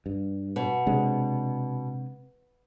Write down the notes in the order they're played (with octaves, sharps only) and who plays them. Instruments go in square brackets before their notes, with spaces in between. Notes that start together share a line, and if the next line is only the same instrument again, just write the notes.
[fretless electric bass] G2
[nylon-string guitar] B2
[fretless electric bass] C3 G#3 D4